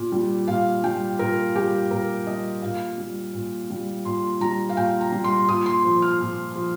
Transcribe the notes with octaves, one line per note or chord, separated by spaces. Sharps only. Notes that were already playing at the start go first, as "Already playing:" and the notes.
Already playing: A#2
G3
A#2 F5
G3 G5
A#2 A#4
G3 G4
A#2 A#4
G3 D#5
A#2 F5
G3
A#2
G3
A#2 C6
G3 A#5
F5
A#2 G5
A#5
G3
C6
A#2 D#6
C6
F3
F6
A#2
F3